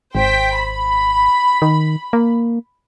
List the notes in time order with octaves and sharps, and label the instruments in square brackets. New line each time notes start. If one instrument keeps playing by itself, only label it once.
[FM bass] G#1 [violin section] C5 G5 B6
[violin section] B5
[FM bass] D#3
A#3